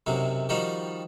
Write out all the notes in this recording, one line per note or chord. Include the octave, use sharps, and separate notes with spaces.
B1 F#2 C3 F#3
D#3 F3 G3 D#4 F#4